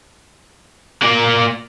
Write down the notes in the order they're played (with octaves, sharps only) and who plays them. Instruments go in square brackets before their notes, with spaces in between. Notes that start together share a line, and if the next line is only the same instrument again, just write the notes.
[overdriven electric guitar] A#3 D5